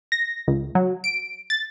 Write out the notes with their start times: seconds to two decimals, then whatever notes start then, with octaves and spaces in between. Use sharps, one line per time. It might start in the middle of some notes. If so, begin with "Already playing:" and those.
0.12 A#6
0.48 C#2
0.75 F#3
1.04 D7
1.50 A6